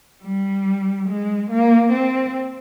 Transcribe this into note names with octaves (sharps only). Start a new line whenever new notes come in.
G3
G#3
A#3
C4